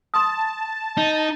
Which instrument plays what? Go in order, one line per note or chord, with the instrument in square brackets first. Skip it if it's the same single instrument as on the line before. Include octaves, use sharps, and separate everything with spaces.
[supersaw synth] A5 [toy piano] C6 D#6
[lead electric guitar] D#4